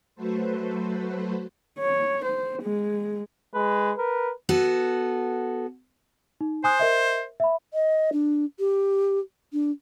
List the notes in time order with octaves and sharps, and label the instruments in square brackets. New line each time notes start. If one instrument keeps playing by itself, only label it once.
[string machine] F#3 A3 F#4 A4 B4 C5
[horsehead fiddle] C#5
C5
G#3
[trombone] G#3 [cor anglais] B4
[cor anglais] A#4 [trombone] B4
[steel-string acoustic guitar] B3 F#4 A4
[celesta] D#4
[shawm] C5 [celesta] G#5 D#6 F#6
[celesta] A#4 D#5 E5
E5 B5
[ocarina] D#5
D4
G4
D4